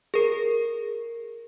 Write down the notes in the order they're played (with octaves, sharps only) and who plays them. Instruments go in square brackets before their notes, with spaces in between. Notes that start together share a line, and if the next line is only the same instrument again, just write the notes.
[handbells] G#4 A#4